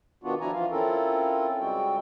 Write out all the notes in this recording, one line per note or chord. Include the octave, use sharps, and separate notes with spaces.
B2 D#3 B3 D4 F4 F#4
E2 F3 D4 E4 G#5 A#5
E3 F3 F4 F5
C4 C#4 E4 F4 A4 A#4
C#3 G3 G#3 C4 F#4 G5